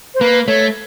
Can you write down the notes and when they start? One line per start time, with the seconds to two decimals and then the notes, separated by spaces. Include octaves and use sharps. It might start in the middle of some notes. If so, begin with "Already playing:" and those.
0.15 C5
0.21 A#3 B4
0.47 A3 C#5